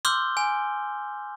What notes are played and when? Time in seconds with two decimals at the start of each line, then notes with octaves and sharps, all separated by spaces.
0.05 C6 D6 E6 F6 G6 G7
0.37 G#5